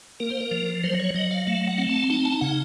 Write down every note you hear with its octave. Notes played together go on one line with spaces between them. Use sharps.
A#3 A#4
C5
A#4
F3
F#3 C5
C#5
F#3 D#5
F5
A3 F5
F#5
C4
A5
D#4 A5
A5
C#3 F#5